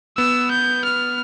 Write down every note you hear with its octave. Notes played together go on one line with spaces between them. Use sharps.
B3 E6
G6
F6